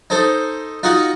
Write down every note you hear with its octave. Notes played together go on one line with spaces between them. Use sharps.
D#4 A4 C5
D#4 F4 F#4 F#5